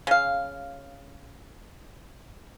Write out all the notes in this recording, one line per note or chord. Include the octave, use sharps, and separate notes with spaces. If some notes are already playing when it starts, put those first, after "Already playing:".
C#3 F5